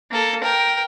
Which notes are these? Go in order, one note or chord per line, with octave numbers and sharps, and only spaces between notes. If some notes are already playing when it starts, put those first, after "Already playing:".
A#3 A4
A#4 G5